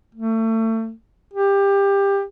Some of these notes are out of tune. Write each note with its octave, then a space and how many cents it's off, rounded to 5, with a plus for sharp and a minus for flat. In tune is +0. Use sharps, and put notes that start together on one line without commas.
A3 +30
G4 +20